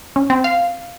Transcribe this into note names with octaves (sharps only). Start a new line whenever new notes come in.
C#4
C4
F5